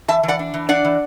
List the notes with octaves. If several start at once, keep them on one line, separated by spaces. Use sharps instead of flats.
E3 E5 A5
E3
D5 F#5
D4
E3
D4 D5 F#5
E3